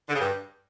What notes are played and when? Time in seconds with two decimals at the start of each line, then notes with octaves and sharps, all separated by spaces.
0.09 D3
0.14 C#3
0.20 G2